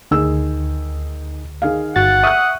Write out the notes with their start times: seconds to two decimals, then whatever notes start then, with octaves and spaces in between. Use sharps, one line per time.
0.11 D2 D#3 G#4 E6
1.62 D#3 G#4 F5
1.96 G1 F#4 F#5 A6
2.23 E5 C#6 D#6 F#6